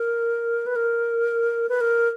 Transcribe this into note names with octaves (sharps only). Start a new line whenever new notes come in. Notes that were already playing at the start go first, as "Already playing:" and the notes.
Already playing: A#4
B4
A#4
B4
A#4